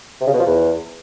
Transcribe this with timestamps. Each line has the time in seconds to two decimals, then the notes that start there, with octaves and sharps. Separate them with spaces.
0.21 C3
0.27 C#3
0.33 B2
0.40 F3
0.46 E2